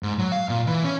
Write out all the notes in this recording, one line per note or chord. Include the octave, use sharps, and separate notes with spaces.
G#2
F#3
F5
A#2
E3
C#4